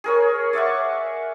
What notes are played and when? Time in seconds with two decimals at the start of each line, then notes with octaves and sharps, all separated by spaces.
0.04 G#4 A#4 C#5
0.53 D5 E5 F#5 C#6